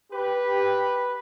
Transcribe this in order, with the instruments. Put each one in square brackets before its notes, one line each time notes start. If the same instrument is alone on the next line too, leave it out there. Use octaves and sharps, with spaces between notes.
[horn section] G4 B4